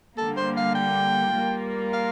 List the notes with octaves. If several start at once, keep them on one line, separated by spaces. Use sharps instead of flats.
D3 G3 A#3 A4
C5
F5
G5
G3 A#3 F4 A#4
F5